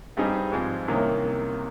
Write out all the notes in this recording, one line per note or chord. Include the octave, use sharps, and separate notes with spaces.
G2 G3 C4 D#4 G#4
G#2 F3 G#3 C4
C2 C3 D#3 A#3 C#4